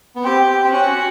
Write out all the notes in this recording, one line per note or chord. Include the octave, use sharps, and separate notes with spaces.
B3
C4 G4
C4
C#4 F#4